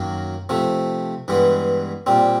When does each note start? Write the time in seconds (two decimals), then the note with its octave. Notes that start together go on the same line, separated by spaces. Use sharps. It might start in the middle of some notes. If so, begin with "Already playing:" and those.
Already playing: F#2 D#3 F#3 A#3
0.49 C3 F3 A3
1.28 G2 E3 G#3 B3
2.06 A#2 G3 C4